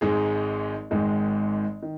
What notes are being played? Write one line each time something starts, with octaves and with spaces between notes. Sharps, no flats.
G#1 G#2 G#3 D#4 G#4
G#1 G#2 D#3 G#3
D#3